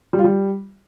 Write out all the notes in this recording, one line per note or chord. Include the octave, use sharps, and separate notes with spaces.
G3
F4
G3